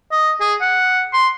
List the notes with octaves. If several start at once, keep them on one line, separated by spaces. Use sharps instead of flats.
D#5
G#4
F#5
C6